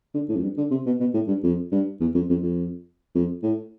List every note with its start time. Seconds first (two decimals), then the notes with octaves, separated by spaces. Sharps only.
0.14 D3
0.29 A2
0.36 F2
0.43 G2
0.58 D3
0.71 C3
0.86 B2
1.01 B2
1.14 A2
1.28 G2
1.44 F2
1.72 G2
2.00 E2
2.15 F2
2.30 F2
2.43 F2
3.15 F2
3.43 A2